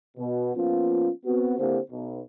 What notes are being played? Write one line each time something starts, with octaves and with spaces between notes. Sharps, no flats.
B2
F3 A#3 B3 C#4 F4
B3 C4 F#4
D3 A#3 C4 E4 G4 C5
B1 B2